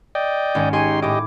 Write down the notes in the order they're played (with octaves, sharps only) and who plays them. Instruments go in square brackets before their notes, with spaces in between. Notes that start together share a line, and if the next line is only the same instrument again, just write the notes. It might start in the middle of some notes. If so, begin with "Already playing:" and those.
[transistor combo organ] D5 D#5 G5
[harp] G#1 C#4
[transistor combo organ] D#4 G4 C6 [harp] G#4 G#5 C#6
[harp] A2 D6 [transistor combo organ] G4 D#5